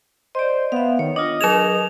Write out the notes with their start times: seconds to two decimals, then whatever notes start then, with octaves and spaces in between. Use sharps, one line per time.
0.35 C5 D5 D#5
0.72 B3 E5 F5
0.99 D#3 C#5
1.16 D4 F4 D#5
1.41 F#3 G#4 A#4 E7 F7